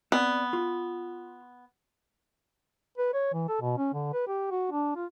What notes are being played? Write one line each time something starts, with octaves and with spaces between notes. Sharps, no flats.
B3 C4 D5 F#5
F4
B4
C#5
E3
A4
B2
C#4
D3
B4
G4
F#4
D4
F4